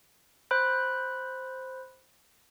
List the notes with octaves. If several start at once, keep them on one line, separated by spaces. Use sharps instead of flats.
C5 B5 F#6